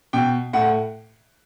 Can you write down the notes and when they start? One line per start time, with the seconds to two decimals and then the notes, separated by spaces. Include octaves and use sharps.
0.13 B2 G5
0.53 A2 F#5